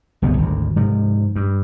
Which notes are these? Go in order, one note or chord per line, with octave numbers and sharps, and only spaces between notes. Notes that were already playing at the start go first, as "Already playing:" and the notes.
D1 C2 G2 B3
G#1 D2
G#2 C3 F3
G2